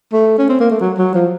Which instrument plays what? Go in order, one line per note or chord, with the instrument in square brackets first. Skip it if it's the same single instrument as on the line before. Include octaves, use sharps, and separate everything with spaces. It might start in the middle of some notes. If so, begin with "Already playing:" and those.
[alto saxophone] A3
C#4
C4
A#3
A3
F#3
F#3
F3